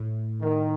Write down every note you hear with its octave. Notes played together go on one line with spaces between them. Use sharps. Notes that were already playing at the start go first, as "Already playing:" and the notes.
Already playing: A2
D#3